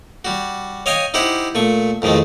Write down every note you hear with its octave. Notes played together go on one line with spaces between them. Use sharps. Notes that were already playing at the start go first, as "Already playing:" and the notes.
G3 F#4
C#5 D#5 F5 G5 G#5
D#4 E4 G4 C5 F#5
A#2 A3 C#6
F2 A2 D#3 G#3 A3